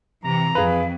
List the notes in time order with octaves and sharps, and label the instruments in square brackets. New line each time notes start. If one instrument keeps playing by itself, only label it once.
[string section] C3 E3 [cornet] A#5
[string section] F2 [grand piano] G#4 B4 [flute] F5